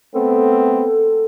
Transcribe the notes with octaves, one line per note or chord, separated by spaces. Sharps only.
A3 B3 C4 A4